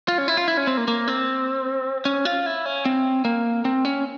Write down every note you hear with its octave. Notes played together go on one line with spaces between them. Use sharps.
F4
C#4
E4
F4
E4
C#4
C4
A#3
A#3
C4
C#4
F4
E4
C#4
C4
A#3
C4
C#4